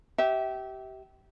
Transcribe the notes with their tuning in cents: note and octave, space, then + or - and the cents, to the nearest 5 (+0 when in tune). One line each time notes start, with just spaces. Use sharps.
G4 -25 E5 -25